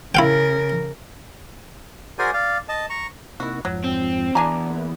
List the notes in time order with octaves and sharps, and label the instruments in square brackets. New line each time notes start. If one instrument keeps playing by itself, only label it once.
[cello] C#3 A#4 [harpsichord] E4 F5 G5
[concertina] F#4 G#4 A#4 C5 D5 G#5
D5 F5
D#5 A5
A#5 C#6
[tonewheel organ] C3 A#3 D#4 [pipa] E4 F#4
[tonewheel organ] F2 G#2 F3 [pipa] F#3
[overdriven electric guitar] C4
[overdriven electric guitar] E2 [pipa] D4 G#5 A#5
[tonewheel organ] A#3 E4 B4